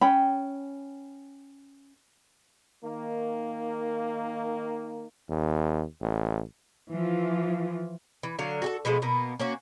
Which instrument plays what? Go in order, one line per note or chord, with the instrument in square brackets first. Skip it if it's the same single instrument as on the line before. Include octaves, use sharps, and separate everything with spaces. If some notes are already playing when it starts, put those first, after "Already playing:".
[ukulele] C#4 G5 B5
[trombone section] D#3 A#3
[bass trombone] D#2
A1
[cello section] E3 F3 F4
[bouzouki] E3
D3 F#3 F5
F#4 G#4 A4
B2 F3 G#3 A3
B2 A#3 B3
A#3 C#4 F#4